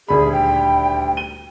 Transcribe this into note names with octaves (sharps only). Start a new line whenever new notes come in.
D#1 D2 G#4 B5
G5
D#7 G7